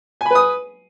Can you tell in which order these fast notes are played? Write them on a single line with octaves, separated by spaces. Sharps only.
G#5 B5 B4 D#6